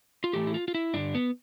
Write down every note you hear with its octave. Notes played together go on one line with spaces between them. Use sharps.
F4
A2 E3 A3 G4
E4
F4
F4
E4
G2 D3 G3 D4
B3